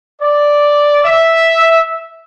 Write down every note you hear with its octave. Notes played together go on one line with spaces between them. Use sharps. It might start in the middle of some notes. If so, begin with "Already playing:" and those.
D5
E5